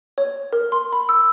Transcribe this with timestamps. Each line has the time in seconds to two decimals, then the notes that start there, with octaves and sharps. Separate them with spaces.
0.18 C#5
0.53 A#4
0.72 C6
0.93 B5
1.09 E6